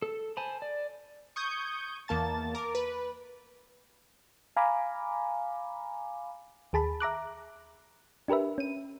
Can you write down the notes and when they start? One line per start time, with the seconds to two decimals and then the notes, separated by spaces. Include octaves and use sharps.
0.02 A4
0.37 C5 G#5 A5 B5
0.62 D5
1.36 C#6 D#6 G6 G#6
2.08 E2 A#3 A5 A6
2.55 A#4 D6
2.75 B4
4.57 F5 G#5 A#5 B5 D6
6.73 D#2 G#4 A5 B5
7.00 E5 A#5 D6 F#6
8.28 D4 G4 A#4 B4 E5
8.58 C#4 D#7